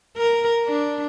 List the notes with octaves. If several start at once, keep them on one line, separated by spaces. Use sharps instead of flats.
A#4
D4